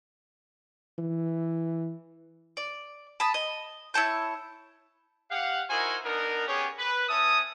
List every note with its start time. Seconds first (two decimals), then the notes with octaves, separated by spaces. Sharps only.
0.98 E3
2.57 D5
3.20 A5 B5 D#6
3.34 D#5
3.94 E4 C#5 A5 G6
5.31 G4 F5 F#5
5.70 D#4 E4 F#4 A#4 C5 G#5
6.04 B3 D4 D#4 A#4
6.47 B3 C#4 G4 G#4 C#5
6.78 B4
7.08 C#4 E5 A5 D#6